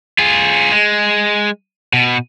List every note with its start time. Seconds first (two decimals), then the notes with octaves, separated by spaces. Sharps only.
0.19 F4 G#4
0.72 G#3
1.93 B2